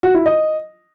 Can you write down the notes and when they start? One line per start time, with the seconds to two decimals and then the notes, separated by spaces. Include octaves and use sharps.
0.03 F#4
0.14 E4
0.26 D#5